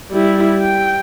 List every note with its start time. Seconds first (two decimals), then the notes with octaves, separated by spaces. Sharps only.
0.11 G3 E4
0.61 G5